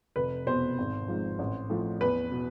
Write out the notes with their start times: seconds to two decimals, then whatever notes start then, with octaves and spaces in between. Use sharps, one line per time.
0.16 F1 B4
0.46 E2 B2 C5
0.78 G#1
1.08 G#2 F3
1.39 A1
1.70 A2 F3
2.01 E2 B4
2.32 B2